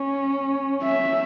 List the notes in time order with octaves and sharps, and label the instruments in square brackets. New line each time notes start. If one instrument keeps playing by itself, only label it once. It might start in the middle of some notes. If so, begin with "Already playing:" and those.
Already playing: [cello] C#4
[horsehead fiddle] E5